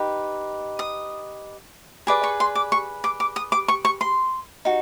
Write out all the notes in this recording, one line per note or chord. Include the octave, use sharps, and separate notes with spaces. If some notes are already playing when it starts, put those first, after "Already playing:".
Already playing: D#4 G4 B4 D#5
D#6
G#4 B4 D5 D6
C#6
C6
D6
C#6
D6
D6
D#6
D6
C#6
C#6
C6
D#4 F#4